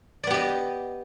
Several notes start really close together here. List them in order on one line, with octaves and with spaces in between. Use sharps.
D5 B3 G4 D#5